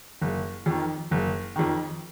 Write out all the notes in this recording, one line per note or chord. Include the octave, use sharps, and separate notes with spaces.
F#1
F2 D#3
F#1
F2 D#3